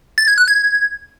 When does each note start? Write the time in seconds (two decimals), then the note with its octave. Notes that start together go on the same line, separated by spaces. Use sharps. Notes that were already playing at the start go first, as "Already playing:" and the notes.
0.18 A6
0.28 G#6
0.38 F#6
0.48 G#6